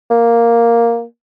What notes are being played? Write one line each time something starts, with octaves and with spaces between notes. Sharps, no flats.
A#3